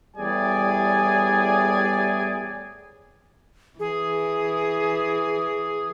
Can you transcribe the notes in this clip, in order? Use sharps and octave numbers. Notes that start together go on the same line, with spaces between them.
E2 A2 G3 G#4 D5 G#5
E3 G#4